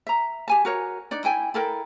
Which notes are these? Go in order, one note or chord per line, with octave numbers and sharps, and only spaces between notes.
E5 A#5
G4 G#5 A5
F#4 A#4 C#5
D4 D#4 D5
E4 G5 G#5
E4 A4 A#4 G5